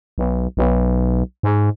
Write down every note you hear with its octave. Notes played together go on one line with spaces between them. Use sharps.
B1
B1
G#2